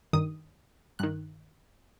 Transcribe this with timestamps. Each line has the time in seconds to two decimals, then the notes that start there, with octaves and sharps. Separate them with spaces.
0.13 G2 D#3 D#6
0.99 G2 D#3 F#6